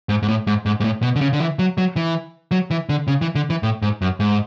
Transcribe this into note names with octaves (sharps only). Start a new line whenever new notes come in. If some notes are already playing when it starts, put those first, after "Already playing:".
G#2
G#2
A2
G#2
G#2
G#2
A2
B2
D3
C#3
D3
E3
F#3
F#3
E3
F#3
E3
D3
C#3
E3
D3
E3
A2
G#2
F#2
G#2